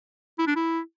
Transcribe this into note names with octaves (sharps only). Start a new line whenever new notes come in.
E4
D4
E4